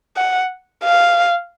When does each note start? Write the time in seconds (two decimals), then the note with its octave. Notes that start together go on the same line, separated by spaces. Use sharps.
0.17 F#5
0.84 F5